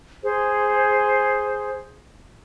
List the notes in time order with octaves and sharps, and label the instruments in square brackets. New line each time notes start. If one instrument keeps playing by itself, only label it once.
[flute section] G#4 C5